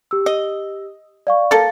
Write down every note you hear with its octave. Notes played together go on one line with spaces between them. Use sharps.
G4 E6
D#5
D5 F5 C#6
A#3 A4 F5 A6